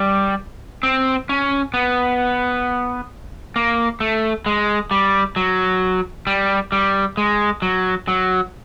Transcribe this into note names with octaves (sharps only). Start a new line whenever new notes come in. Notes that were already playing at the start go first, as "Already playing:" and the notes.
Already playing: G3
C4
C#4
B3
A#3
A3
G#3
G3
F#3
G3
G3
G#3
F#3
F#3